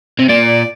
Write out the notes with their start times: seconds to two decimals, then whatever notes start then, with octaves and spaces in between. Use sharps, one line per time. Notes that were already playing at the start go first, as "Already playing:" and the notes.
0.19 C3
0.29 A#2 D5